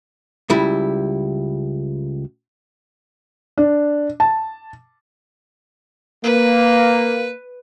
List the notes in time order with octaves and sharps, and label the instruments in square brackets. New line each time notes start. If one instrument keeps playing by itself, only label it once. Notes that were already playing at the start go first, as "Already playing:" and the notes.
[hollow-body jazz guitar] C#2 G3 E4
[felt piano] D4
A5
[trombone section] A#3 [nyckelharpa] B4